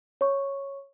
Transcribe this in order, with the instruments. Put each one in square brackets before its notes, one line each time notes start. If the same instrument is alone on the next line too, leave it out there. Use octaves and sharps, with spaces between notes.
[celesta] C#5 C#6